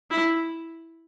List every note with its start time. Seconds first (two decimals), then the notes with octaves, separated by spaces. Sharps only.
0.11 E4